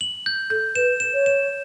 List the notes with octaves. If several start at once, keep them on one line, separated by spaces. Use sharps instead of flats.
F#7
G6
A4 G6
B4 E7
E7
C#5
E7